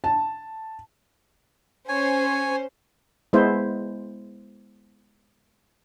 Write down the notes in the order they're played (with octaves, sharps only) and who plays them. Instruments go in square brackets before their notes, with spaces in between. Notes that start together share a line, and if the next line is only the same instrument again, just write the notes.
[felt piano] A5
[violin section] C#4 C5 [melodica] C#5 G#5
[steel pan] G#3 B3 E4 C5